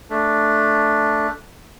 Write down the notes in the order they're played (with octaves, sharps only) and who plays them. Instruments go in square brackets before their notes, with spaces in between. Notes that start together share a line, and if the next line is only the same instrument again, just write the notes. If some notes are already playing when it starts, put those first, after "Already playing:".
[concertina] A3 D4